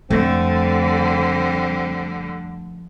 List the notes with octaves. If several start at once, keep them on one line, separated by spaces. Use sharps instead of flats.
F2 D3 G3 A3 C4